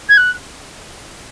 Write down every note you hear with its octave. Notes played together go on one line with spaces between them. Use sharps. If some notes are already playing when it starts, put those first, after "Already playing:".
G#6
F#6